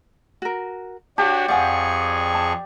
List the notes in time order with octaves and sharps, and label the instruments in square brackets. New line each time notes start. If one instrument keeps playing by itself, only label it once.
[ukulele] F#4 A#4
[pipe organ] D4 F#4 C#5 [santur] G4 [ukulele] F5 A5
[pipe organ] F2 G#4 C#6 [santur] D5 [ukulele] F5 F#5 G#5
[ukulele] A5